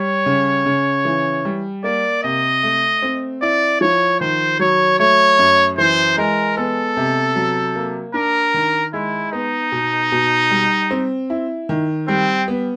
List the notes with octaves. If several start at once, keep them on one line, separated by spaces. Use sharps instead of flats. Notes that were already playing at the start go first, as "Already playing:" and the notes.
Already playing: G3 C#5
C#3
C#3
E3
G3
A#3 D5
C3 D#5
A3
C4
E4 D5
F3 C#5
D#3 C5
F#3 C#5
A3 C#5
F#2
E3 C5
G#3 A#4
B3 A4
C3
F#3
A#3
D4 A#4
D#3
G#3 E4
B3 D#4
B2
B2
G3
C4
E4
D#3
G3 C4
B3